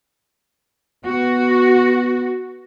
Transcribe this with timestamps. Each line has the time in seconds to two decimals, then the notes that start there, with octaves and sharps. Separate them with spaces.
1.05 B3 F#4